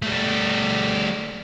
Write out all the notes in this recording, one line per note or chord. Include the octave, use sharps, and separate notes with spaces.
G3 A3